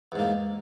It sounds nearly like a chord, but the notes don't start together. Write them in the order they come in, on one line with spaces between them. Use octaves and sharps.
E2 G#2 A#3